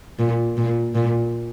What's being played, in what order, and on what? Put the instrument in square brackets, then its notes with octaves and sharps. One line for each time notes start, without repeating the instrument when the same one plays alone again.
[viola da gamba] A#2
A#2
A#2